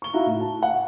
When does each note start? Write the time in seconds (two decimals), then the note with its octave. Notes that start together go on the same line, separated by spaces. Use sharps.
0.02 C#6 G7
0.14 D#4 E4 F#4 F5 A#5
0.26 A2
0.41 A5
0.63 F#5